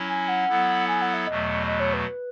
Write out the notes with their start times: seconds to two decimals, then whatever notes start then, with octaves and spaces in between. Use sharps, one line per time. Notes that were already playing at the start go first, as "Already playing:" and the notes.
Already playing: F#3 C#4 E4
0.08 G#5
0.28 F#5
0.48 F#3 B3 E4 A4
0.88 G#5
1.01 F#5
1.14 E5
1.27 E2 B2 F#3 A3 D#5
1.66 D#5
1.80 C#5
1.93 B4